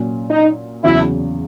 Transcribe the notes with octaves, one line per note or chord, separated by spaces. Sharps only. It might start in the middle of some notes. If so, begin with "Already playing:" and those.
Already playing: A#2 F#3 C#4
D#4
E2 C#3 F#3 E4